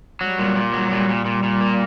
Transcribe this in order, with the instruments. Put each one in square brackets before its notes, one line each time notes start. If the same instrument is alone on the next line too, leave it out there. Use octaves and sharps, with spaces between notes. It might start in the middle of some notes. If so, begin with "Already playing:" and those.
[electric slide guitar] F#3 [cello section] G3
[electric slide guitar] A#2
A#2
F#3
[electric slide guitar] A#2 [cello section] G3
[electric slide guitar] A#2
A#2
A#2
A#3